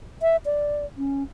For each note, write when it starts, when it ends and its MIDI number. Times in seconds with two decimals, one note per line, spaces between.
0.22 0.36 76
0.46 0.86 74
0.97 1.23 61